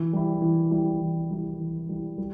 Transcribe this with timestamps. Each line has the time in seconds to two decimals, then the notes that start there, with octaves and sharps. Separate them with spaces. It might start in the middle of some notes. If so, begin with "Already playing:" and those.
Already playing: E3
0.13 G3 E4
0.42 E3
0.71 G3 E4
1.01 E3
1.30 G3 E4
1.60 E3
1.89 G3 E4
2.18 G3